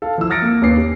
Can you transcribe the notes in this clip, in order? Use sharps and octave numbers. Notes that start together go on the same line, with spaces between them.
A4 F5
F3 E4 E6
D#6 F6 A6 A#6 C#7 D7
A#3
D#2 A#3 C#4 B4 D6 C7
G4